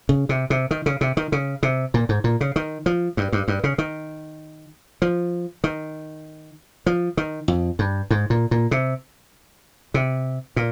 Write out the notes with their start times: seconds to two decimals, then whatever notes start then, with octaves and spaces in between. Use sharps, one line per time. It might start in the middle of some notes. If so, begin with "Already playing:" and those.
0.09 C#3
0.29 C3
0.50 C3
0.71 D#3
0.86 C#3
1.01 C3
1.17 D#3
1.32 C#3
1.63 C3
1.94 A#2
2.09 G#2
2.24 A#2
2.41 C#3
2.56 D#3
2.86 F3
3.17 G2
3.32 G2
3.48 G2
3.64 C#3
3.78 D#3
5.02 F3
5.64 D#3
6.86 F3
7.17 D#3
7.48 F2
7.79 G2
8.11 G#2
8.30 A#2
8.51 A#2
8.71 C3
9.94 C3
10.56 A#2